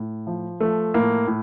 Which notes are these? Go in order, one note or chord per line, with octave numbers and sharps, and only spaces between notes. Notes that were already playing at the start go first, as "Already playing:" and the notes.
Already playing: A2
F3
F3 A3
A2 A#3
A2